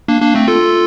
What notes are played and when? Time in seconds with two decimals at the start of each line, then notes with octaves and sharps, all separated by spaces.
0.08 A#3 D4
0.22 A#3 D4
0.35 A3 C4
0.48 F4 A4